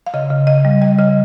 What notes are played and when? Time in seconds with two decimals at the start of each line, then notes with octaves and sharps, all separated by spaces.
0.07 F5
0.14 C#3 D#5
0.31 C#3
0.47 C#3 D#5
0.65 G3
0.82 G3 D#5
0.98 C#3 D#5